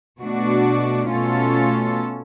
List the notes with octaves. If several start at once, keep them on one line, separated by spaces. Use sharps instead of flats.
B2 A3 D4 F#4
B2 A3 C#4 F4 A4